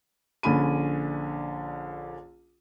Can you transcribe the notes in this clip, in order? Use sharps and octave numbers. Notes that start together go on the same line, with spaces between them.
A#1 D3 C#4 B5 D#7